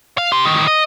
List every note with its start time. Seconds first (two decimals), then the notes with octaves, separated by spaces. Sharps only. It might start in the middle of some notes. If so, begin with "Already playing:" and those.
0.18 F5
0.32 G4 C6
0.45 A2 D#3
0.67 D#5